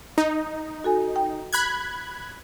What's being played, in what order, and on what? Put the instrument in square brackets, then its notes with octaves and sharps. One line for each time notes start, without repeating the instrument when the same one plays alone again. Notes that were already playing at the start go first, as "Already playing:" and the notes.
[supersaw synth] D#4
[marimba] F#4 A4 G#5
G5
[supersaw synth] B5 F#6 G#6